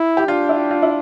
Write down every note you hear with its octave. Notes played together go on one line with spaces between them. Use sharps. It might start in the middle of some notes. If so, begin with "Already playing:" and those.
Already playing: E4
G4
D4 F4
E4
F4
E4